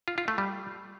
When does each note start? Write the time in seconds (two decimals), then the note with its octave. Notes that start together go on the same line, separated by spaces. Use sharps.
0.08 F4
0.18 F4
0.28 A3
0.38 G3